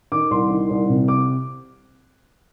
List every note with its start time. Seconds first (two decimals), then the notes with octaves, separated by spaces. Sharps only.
0.12 D#3 D6
0.31 C2 C6
0.50 D#3
0.70 C2
0.89 C3
1.08 D6